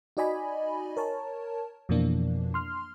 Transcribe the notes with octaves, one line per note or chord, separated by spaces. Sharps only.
D#4 F#4 D5 D#5 G#5 B5
A#4 C#5 A5
F2 B2 E3 F3 A#3 D4
C6 F6